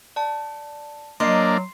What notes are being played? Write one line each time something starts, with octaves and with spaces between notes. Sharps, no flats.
D5 A5
F#3 A#3 D4 D#5 C6 C7